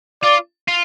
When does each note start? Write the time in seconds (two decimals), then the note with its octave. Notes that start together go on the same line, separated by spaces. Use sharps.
0.23 F4 D5
0.68 F4